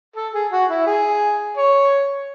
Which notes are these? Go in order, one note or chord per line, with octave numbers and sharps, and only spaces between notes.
A4
G#4
F#4
E4
G#4
C#5